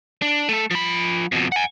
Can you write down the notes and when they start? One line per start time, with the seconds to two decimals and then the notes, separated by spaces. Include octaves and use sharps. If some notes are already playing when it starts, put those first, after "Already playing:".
0.22 D4
0.49 A3 A4
0.71 F3 B5
1.32 F2 B2
1.52 F#5 G#5